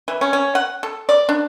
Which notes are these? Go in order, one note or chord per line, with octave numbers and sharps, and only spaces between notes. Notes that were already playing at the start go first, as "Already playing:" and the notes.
E3
C#4
C#4
F#5
A4
D5
D4